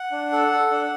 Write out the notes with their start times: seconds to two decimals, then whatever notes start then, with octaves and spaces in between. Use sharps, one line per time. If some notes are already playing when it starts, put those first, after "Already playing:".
Already playing: F#5
0.12 D4
0.32 A4
0.52 A4
0.71 D4